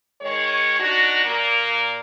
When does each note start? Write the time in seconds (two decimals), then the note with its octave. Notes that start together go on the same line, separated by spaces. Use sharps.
0.22 D#3 G#3 C#5
0.79 D4 D#4 F#4
1.25 A#2 A#3